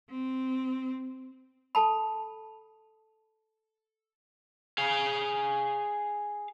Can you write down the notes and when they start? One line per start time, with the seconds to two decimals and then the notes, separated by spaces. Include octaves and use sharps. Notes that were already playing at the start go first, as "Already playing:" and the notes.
0.10 C4
1.75 A4 A5 B5
4.78 G#4 F5